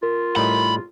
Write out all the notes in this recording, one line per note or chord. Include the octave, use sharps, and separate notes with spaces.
F4 A#4
A2 G3 D#4 B5